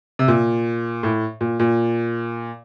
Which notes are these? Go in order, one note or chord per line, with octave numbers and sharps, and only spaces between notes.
C3
A#2
A2
A#2
A#2